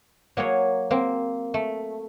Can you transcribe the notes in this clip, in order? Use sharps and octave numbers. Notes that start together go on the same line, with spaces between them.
F#3 A#3 G#4 C#5
A#3 C4
A3